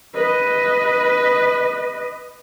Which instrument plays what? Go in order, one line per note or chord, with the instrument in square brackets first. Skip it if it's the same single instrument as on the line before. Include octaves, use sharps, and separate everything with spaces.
[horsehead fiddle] B4 D#5